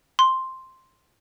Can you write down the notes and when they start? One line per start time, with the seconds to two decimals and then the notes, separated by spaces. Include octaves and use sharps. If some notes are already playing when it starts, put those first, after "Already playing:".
0.19 C6